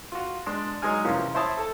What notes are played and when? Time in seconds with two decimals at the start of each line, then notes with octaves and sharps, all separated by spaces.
0.12 F4 F#4
0.46 G#3 D4 C6
0.82 F#3 G#3 D#4 G#4 G#5 F6
1.05 F2 C3 E3 F3 A#3 C#4
1.34 E4 C5 C#5 E5 A5 D#6
1.57 A4 A5